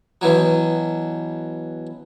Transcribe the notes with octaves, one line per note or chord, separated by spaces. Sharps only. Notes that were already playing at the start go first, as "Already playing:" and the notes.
B2 E3 F#3